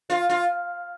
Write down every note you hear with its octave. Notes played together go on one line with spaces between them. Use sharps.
F4
F4